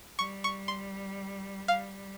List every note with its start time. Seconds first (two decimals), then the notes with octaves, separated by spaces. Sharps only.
0.19 G3 C#6
0.44 C#6
0.68 C6
1.68 G3 F5